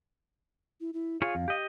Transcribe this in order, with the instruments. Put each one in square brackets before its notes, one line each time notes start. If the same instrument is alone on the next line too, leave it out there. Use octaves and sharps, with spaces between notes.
[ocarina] E4
E4
[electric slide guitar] F4 G#4 C#5 [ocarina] F5
[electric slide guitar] F2
G4 D#5